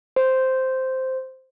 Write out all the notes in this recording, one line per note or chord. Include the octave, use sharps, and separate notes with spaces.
C5